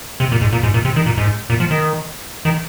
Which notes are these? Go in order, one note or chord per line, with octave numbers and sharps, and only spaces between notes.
C3
A#2
G#2
A#2
G#2
A#2
C3
D#3
A#2
G#2
A#2
F3
D#3
D#3